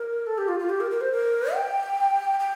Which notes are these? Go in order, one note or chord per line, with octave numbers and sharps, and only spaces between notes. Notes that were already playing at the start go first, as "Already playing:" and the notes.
Already playing: A#4
A4
G4
F4
F4
G4
A#4
A#4
C5
A#4
G5
G5